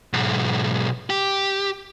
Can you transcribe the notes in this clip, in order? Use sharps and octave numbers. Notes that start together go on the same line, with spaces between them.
B1 G#2
G4